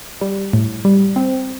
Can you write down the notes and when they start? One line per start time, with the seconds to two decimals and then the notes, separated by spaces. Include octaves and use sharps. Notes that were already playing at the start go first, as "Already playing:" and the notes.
0.21 G3
0.53 A2
0.85 G3
1.16 C4